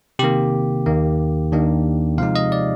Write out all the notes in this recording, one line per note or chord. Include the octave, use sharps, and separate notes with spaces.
C3 D#3 A#3 G4
D#2 D#3 A#3
D#2 D#3 A#3 D4
C3 F3 G#3 D#4 F5
D#5
D5